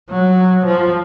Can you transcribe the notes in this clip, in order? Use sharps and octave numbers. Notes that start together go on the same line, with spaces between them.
F#3
F3